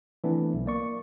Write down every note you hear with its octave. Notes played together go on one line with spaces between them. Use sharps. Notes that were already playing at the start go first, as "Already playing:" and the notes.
E3 A3 B3 C4 D4
B1
A#3 D5 C#6